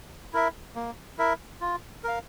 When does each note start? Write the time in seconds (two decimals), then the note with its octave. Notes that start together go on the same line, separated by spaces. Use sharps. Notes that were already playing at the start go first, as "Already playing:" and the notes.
0.33 E4 A#4 E5
0.76 A#3
1.18 E4 A#4 E5
1.61 F4
2.04 A#4 F5